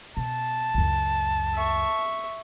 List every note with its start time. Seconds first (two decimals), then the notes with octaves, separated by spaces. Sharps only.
0.17 B2 A5
0.74 C#2 F#2
1.54 E5 C#6